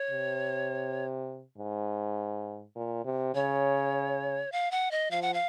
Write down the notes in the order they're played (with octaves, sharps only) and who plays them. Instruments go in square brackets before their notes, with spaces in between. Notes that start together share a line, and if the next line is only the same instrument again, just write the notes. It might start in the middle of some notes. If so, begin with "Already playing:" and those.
Already playing: [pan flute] C#5
[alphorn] C3
G#2
A#2
C3
[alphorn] C#3 [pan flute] C#5
[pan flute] F5
F#5
D#5
[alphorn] F3 [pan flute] F5
[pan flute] F#5
F5